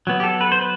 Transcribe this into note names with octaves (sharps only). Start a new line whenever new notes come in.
F#3 B3
G4
A4
B4
C5
B4